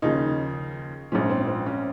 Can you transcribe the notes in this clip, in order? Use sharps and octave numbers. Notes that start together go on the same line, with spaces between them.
D#2 C#3 F3 D#4
A#1 G#2 F3 C#4
C4
C4
C#4